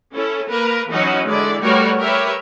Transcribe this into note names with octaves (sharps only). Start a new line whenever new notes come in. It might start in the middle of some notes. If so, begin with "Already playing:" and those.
C#4 E4 A4
A#3 A#4 B4
E3 F#3 C#4 D#4 F#4
D3 G#3 E4 D5
G3 A3 F#4 A#4 B4 C#5
G4 A#4 B4 C#5 E5